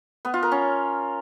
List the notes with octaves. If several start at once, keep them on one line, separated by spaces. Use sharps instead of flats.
B3
F4
A#4
C#4